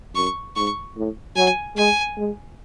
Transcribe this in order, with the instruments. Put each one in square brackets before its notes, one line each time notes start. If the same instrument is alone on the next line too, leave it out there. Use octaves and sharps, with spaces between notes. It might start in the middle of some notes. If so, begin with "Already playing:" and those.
[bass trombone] F#2 [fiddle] C#6
[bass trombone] G#2 [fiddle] C#6
[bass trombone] A2
[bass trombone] F#3 [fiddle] G#5
[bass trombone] G#3 [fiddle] G#5
[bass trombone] G#3